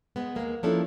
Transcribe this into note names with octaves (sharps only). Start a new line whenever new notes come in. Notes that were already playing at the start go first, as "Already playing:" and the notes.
G#3 B3
D#2 G#3 A#3
F3 A#3 C#4 D4 E4 A4